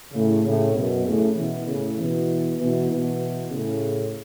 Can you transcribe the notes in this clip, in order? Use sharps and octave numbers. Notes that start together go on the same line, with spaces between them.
A2 C#3
A2 C#3
F#2 B2
A2 C#3
B2 E3
A2 C#3
B2 E3
B2 E3
B2 E3
A2 C#3